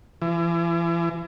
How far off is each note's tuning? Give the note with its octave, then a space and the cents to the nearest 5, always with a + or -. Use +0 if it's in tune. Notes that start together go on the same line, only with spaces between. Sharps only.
E3 +40